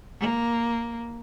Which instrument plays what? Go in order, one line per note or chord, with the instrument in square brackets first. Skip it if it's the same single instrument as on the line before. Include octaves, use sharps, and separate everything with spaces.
[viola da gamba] A#3